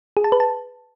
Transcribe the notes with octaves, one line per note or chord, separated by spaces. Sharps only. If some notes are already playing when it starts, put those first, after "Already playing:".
G#4
A5
B4
A5